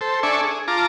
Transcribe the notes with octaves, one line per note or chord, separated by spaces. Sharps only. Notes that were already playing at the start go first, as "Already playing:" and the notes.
A4 C5
D4 A4 D5 E5 G#5 C#6
G#4
F4 A5 A#5 D6